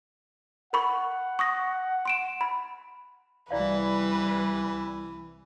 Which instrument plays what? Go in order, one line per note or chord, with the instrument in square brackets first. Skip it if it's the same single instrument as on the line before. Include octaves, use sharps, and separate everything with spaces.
[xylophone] A#4 B5 C#6 [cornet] F#5
[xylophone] C#6 D#6 A#6
C6 D7 E7
B5
[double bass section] C2 G3 [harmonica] E3 [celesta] E4 D5 F5 [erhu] B4